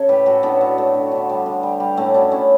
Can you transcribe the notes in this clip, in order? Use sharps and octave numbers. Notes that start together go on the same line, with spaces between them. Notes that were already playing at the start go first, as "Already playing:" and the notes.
Already playing: C#3 A4 C#5
A2 G4 B4
A2 F#4 A4
A2 B3 D4
F#3
A3
D3
D3
G3
D3
G3
G3
A2 A3 C#4
F#3 B3 D4
A3 C#4 E4